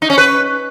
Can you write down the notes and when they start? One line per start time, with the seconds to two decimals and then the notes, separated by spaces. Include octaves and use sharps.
0.02 D#4
0.10 C#4
0.18 B4